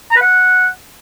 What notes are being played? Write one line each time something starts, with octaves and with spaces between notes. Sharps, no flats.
A#5
B4
F#5